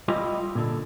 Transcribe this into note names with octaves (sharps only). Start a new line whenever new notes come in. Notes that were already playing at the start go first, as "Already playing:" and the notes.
G3 E4 F4 D#5
A#2 D3